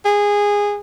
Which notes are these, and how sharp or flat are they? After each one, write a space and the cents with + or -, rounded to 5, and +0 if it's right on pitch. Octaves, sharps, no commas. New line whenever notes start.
G#4 -15